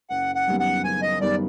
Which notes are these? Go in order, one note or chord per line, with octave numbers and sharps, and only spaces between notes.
F#1 F#5
F#5
F#2 D#3 G3 B3
F#5
F#1 G#5
D#5
F#2 D#3 G3 B3 D5